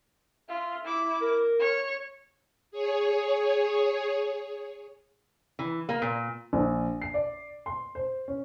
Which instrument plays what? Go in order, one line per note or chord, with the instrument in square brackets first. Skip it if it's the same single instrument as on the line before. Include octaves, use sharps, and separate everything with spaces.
[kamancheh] F4 [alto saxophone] E5
[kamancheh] E4 D6
[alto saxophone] A#4
[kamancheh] C#5 C#6
[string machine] G#4 C#5
[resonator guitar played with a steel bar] E3
A#3
A#2
[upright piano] A#1
C7
D5
C6
C5
C#4